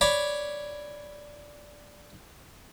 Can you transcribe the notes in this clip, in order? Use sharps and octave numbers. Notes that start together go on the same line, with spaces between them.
C#5 D5 B5